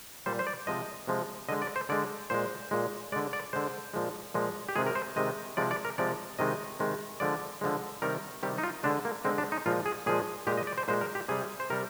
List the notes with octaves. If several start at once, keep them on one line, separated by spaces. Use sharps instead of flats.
A#2 G3 C5
C5
D5
C3 F3 G#3 D#5
C3 F3 G#3
D3 G#3 D#5
D5
C5
D3 G#3 D5
A#2 G#3 C5
A#2 G#3
D3 G#3 D5
D5
D3 G#3 C5
A#2 F3 G#3
A#2 F3 G#3
G4
C3 D#3 G#3 G#4
A#4
C5
C3 D#3 G#3 D#5
C3 F3 G#3 D5
D5
A#4
C3 F3 G#3 D5
C3 D#3 G#3 D#5
C3 D#3 G#3
D3 F3 G#3 D5
D3 F3 G#3
C3 D#3 G3 A#4
C3 D#3 G3 G4
D#4
F4
D3 G#3 D4
A#3
D3 G#3 C4
D4
D#4
A#2 F3 G#3 F4
G#4
A#2 F3 G#3 G#4
A#2 G#3 G4
D#5
D5
C5
A#2 G#3 C5
A#4
G4
C3 G3 G#4
C5
C3 G3 A#4